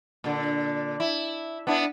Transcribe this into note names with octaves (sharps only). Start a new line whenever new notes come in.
A#2 D3
E4
B3 D4 E4